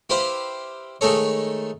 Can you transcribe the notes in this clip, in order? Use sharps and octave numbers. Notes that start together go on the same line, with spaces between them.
E4 G4 B4 C5 F5
D#3 G#3 A3 D#4 A4 C#5